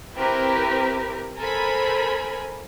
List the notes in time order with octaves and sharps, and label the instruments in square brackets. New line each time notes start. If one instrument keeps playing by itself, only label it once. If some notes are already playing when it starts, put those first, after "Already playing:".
[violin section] C4 E4 G4 A#4 B4
A4 A#4 C5 G#5 B5